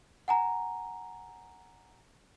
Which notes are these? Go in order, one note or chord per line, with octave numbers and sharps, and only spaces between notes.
F#5 G#5 A#5